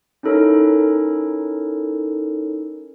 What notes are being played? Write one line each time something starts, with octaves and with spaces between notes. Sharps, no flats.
C#4 D#4 E4 A4 A#4 C#5